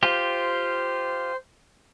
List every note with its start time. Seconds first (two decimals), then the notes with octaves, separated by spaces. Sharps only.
0.03 F4 G4 C5